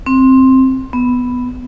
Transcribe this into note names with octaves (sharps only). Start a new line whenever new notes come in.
C4
B3